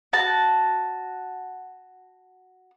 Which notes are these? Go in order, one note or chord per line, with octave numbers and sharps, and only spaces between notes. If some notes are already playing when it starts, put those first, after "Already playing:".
F#4 A5